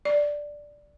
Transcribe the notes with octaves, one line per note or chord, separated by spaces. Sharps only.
D5